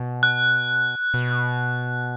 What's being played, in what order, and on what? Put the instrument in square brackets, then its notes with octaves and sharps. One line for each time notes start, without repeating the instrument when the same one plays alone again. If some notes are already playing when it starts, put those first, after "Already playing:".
Already playing: [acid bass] B2
[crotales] F#6
[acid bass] B2